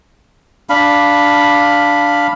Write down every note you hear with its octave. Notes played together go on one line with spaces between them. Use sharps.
D4 F5 B5